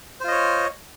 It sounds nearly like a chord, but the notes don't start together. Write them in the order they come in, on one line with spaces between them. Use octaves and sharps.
C5 F4 D#5 C#5